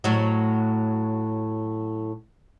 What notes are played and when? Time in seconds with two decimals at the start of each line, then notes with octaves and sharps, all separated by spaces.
0.04 A2 F#3